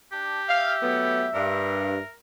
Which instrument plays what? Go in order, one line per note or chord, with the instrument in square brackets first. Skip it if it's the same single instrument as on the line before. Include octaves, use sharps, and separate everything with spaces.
[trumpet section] D4 [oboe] G4
[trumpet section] E5 [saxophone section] F5
[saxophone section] F#3 A3 B3
[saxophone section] G2 [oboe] A#4